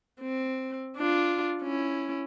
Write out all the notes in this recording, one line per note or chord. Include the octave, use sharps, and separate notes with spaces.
C4
D4 F4
C#4 E4